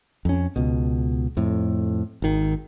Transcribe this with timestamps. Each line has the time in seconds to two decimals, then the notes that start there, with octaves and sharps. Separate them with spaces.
0.25 F2 C#4
0.56 C#2 B2
1.37 F2 A2
2.22 G#1 D#3